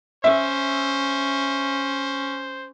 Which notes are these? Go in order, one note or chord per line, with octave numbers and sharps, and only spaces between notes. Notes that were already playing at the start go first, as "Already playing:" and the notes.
C#4 C5 E5